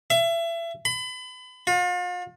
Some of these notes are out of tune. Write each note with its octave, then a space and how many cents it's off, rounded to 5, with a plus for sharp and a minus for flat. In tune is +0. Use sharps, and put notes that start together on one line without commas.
E5 +30
B5 +35
F4 +40